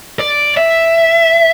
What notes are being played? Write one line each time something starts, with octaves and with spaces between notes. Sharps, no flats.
D5
E5